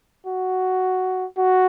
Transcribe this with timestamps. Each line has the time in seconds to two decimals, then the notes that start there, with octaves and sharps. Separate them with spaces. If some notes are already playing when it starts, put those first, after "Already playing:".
0.27 F#4
1.38 F#4